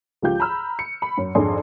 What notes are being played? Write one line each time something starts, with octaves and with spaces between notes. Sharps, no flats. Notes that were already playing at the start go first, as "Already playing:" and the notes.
C#2 F3 F4 G4 G6
A#5 B5 E6 F6
C#7
B5
F#2
G#1 F2 D4 G#4 C6